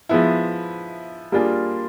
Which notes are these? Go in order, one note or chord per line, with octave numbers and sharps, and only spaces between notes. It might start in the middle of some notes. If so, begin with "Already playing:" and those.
F3 G#3 B3 E4
G3 A#3 D4 F4 G#4